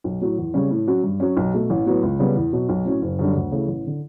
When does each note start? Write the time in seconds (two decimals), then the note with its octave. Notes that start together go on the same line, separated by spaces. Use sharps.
0.04 B1
0.21 A2 F#3
0.38 E2
0.54 C#3 G3 C#4
0.71 A2
0.87 F#3 C#4 F#4
1.04 G2
1.20 F#3 C#4
1.37 B1
1.54 B2 A3
1.70 A1
1.86 A2 F#3 B3
2.03 C#2
2.19 C#3 G3 B3
2.36 E2
2.53 B2 F#3
2.69 B1
2.85 A2 F#3 C#4
3.02 F#1
3.19 F#2 D3 G3 D4
3.36 D2
3.52 C#3 E3 A3
3.68 A1
3.87 D3